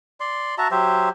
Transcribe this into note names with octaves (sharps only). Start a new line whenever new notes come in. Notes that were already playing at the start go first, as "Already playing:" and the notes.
D5 C6
F#4 E5 A5 A#5
F#3 G4 C5 E5